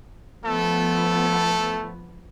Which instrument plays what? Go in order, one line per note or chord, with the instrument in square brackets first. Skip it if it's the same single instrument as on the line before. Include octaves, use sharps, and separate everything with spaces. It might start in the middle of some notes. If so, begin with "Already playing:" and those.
[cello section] F3 B3 [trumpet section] A3 A4